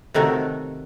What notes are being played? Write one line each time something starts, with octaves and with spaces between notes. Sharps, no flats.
C3 D#3 A3 F#4 C#5